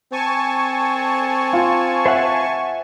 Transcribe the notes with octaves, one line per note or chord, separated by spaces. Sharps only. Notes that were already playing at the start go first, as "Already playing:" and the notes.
C4 G#5 A5 C#6
F4
C5 E5 F#5